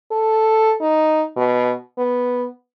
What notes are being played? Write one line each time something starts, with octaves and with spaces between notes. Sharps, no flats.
A4
D#4
B2
B3